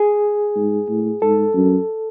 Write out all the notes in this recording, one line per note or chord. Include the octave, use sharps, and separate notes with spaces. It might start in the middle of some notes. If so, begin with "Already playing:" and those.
Already playing: G#4
G#2
A2
G#2 A4
F#2